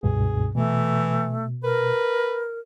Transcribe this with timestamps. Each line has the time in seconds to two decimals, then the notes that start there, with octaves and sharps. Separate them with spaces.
0.03 C#2 G2 B2 G#4
0.55 B2 E3 A3
1.64 A#4 B4